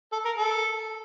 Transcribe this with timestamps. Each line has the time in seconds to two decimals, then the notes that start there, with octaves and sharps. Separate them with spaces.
0.12 A4
0.25 A#4
0.38 A4